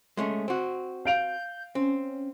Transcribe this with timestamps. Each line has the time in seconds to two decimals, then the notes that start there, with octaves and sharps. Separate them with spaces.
0.17 G#3 A3 C#4
0.48 C4 F#4
1.05 F5 G6 D7 F7
1.75 C4 C#4